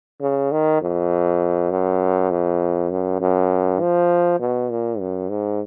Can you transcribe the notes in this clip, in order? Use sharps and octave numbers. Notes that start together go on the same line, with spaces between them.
C#3
D#3
F2
F#2
F2
F#2
F#2
F3
B2
A#2
F#2
G#2